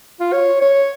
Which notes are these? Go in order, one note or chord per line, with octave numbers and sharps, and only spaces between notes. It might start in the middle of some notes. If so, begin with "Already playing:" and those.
F4
C#5
C#5